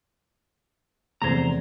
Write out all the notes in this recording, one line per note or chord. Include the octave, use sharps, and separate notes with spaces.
F1 E2 C5 A#5 G#6